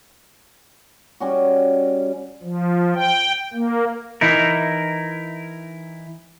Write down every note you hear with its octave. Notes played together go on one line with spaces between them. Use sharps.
G3 C#4 F#4
F3
G5
A#3
E3 D#4 E4 A#4